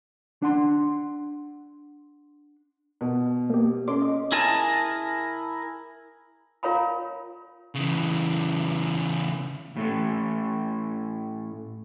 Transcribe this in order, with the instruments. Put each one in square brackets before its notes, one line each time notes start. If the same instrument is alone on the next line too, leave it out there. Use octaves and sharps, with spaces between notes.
[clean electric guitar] D4 F#5 C6
[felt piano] B2
[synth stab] A#3 G4
[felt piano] C#4 [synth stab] A4 C6 D6
[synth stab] D#5
[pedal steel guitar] E4 G#4 A#4 G#5 A5
[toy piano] F4 A#4 C#5 F5 A#5 B5
[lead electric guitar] C#3 E3
[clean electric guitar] A2 A3 C#4